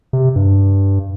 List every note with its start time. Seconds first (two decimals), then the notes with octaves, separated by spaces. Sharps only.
0.13 C3
0.36 G2